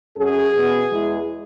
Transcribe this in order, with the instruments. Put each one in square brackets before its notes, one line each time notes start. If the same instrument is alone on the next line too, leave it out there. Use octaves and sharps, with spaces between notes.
[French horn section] F#2 F#3 C#4 G#4
B2 B3
E2 E3 G#3